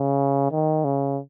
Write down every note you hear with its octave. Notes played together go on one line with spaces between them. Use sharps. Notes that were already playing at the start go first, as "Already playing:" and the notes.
Already playing: C#3
D#3
C#3